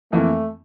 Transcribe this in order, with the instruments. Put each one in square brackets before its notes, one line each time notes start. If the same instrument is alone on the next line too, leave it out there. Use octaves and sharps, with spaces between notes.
[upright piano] F2 E3 A#3 E4 [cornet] A3